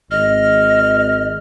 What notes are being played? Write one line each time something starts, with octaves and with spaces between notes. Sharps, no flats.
G#1 D#5 F6